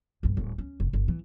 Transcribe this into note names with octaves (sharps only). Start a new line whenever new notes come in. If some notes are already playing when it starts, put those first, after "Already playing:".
A#1 G2
D1 G3
C#4
F1
G1
E3